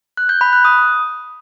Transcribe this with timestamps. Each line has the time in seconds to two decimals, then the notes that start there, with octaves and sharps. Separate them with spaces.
0.17 F#6
0.29 G6
0.41 B5
0.53 F#6
0.65 D#6